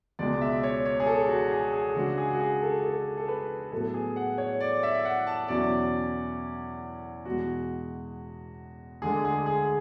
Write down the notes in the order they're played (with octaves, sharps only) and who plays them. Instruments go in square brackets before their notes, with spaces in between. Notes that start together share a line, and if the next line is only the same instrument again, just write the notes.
[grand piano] C#2 B2 G#3 D5
E5
C#5
C#5
G#4
A4
F#4
G#4
G#4
C#3 G#3 D4 F#4
G#4
F#4
G#4
A4
A4
A4
B4
A2 F#3 B3 A4
G#4
F#5
C#5
D5
E5
F#5
A5
E2 B2 F#3 C#4 E4 D5
E2 B2 G#3 F#4
D2 D3 G#3 D4 G#4
G#4
G#4